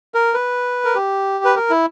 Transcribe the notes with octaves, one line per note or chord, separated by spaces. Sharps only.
A#4
B4
A#4
G4
B4
A#4
E4